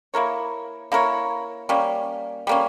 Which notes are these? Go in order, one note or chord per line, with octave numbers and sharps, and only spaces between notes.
A#3 E4 A#4 C#5
A#3 E4 A#4 C#5
G3 A#3 C#4
G3 A#3 C#4